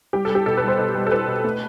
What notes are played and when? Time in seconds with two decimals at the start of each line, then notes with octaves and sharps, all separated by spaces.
0.13 G3 G4
0.25 G3 A4
0.35 G4
0.46 B2 A4
0.57 G3 B4
0.68 C5
0.79 B2
0.95 G3
1.07 A4
1.11 G3 B4
1.27 B2
1.44 A3